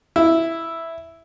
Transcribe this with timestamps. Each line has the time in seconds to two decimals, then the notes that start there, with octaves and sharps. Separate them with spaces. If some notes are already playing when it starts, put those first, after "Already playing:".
0.16 E4